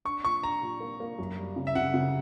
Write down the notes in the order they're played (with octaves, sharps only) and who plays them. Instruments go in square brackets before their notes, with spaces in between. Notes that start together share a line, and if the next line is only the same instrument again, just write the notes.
[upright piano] D4 [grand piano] C#6
[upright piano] A#2 [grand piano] C#6
[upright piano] D4 [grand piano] A#5
[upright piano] A#2
A#3
A#3
F#2
G3
C#3
[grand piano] E5
[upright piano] C#3 [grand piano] F#5
[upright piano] C#3